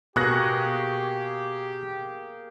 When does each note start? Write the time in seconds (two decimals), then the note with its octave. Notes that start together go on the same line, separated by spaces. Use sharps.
0.16 B2 A#3 G4 G#4 C#6 F#6 A#6